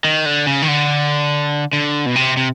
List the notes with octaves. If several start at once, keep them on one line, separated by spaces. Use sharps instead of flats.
D#3
D3
C#3
D#3
D3
D3
B2
C3
C3